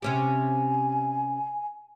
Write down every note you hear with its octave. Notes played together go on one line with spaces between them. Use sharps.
C3 C#4 G4 G#5